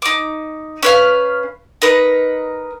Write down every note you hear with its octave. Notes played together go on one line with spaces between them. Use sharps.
D#4 D6
C#4 B4 F5
D#4 A#4 B4